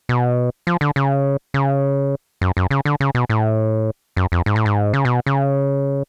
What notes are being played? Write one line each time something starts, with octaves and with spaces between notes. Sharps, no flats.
B2
F3
D3
C#3
C#3
F#2
F#2
C#3
D3
C#3
B2
A2
F#2
F2
G#2
A2
G#2
C#3
B2
C#3